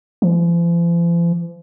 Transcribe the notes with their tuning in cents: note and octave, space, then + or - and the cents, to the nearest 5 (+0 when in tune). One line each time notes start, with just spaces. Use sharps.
F3 -45